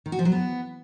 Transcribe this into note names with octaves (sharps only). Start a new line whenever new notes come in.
D#3
F#4
F3
F#3
B3